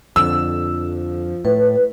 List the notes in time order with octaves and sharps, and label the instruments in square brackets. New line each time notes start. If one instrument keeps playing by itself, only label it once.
[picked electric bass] F2 D3 [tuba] F3 [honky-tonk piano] E6
[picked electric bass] A2 [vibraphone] B4